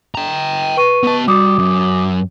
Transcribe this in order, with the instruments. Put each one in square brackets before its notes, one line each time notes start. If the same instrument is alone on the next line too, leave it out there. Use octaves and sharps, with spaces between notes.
[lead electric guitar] G5 A#5
[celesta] B4 C#6 D#7
[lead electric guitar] B3 A5
[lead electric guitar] G3 [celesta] F#4 D6 D#6
[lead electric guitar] F#2